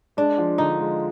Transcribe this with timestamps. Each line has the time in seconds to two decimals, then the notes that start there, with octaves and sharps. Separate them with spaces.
0.17 G#3 D4
0.38 F3
0.58 D3 D#4
0.79 G#3